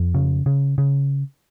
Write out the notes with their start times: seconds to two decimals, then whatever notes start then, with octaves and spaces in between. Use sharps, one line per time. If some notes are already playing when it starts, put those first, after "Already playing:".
Already playing: F2
0.15 C#3
0.46 C#3
0.78 C#3